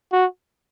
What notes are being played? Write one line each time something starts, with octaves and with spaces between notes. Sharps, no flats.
F#4